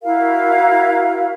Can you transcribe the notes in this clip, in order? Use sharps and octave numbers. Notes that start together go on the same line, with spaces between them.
E4 F#4 A#4 F5